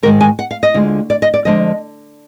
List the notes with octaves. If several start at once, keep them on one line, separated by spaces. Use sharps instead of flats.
G#2 D#3 G#3 A#4
G#5
F#5
F5
D#5
D2 D3 G#3 D4 F4
D5
D#5
D5
F2 D3 F3 G#3 D4 D#5